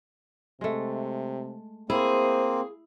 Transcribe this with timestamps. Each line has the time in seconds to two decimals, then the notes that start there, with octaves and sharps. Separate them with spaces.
0.61 C3 G#3 A3
1.90 A#3 C4 E4 G#4 C5